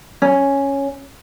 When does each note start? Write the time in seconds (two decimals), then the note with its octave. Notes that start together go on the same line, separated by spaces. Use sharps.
0.22 C#4